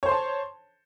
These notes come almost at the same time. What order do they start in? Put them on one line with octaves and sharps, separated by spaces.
C#5 C5 C6 A5